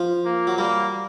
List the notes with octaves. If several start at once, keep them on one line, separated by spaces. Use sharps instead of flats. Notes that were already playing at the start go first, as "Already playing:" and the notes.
Already playing: F3
A#3
F#3
G3 A#3